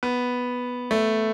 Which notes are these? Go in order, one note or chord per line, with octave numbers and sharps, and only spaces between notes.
B3
A3